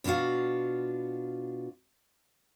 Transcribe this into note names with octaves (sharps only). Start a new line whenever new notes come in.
B2 D4 F4 F#4 F5